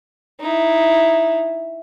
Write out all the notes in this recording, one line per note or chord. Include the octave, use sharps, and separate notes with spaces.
D#4 E4